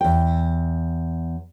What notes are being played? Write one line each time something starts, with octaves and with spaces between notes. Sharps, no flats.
E2 G5